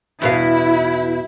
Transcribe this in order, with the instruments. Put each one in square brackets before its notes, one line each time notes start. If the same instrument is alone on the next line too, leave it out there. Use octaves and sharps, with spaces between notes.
[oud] E2 B2 F5 [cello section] E4